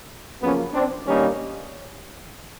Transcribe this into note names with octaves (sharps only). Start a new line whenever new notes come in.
F#2 C#3 F3 A#3 B3 C#4
C4 D4
G2 D#3 G3 A#3 C#4 D#4